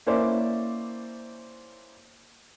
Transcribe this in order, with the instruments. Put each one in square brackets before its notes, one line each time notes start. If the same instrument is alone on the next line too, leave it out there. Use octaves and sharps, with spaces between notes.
[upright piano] A#3 C#4 E4 C5 D5 E5